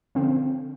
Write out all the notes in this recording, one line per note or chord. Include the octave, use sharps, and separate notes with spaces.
D3 F3 C4